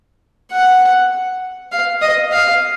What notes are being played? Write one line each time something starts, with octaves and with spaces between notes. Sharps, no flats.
F#5
F5
D#5
F5